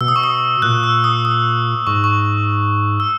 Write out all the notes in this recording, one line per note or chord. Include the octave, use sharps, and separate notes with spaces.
B2 E6
D#6
C#6
D#6
A#2 F#6
E6
D#6
D#6
G#2 C#6
C#6
E6